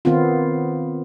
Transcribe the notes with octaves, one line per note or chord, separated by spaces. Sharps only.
D#3 B3 C4 F4